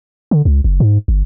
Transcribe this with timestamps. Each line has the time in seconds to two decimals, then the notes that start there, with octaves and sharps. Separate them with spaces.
0.31 D3
0.45 C#2
0.64 F#1
0.80 G#2
1.08 G1